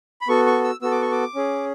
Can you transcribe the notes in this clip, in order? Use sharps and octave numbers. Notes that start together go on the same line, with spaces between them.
B5
B3 F#4 A4 C#6
C#6
E6
B3 F#4 A4 E6
D6
C#6
D6
C#4 G#4